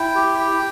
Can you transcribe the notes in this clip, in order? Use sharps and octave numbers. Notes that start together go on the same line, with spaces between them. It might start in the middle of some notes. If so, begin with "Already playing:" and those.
Already playing: E4 G5
G4
G4